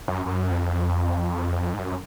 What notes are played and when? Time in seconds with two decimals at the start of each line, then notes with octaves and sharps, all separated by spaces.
0.08 F#2
0.26 F#2
0.51 F2
1.74 G#2
1.79 F#2